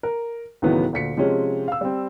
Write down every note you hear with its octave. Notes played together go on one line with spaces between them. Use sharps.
A#4
C#2 A2 D#3 E3 F#3 B3
D2 A#2 B6 C#7
C3 F3 G#3 C4 C#4 G#4
F5 E6
G3 C4